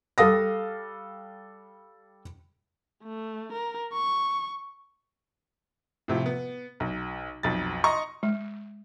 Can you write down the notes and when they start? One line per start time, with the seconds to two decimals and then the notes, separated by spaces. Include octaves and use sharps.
0.18 G3 A4 F5 D#6 A#6
3.04 A3
3.53 A#4
3.94 C#6
6.08 A2 C3 F3
6.26 B3
6.80 B1
7.43 B1 F2 A6
7.84 D#5 A#5 C6 C#6
8.23 G#3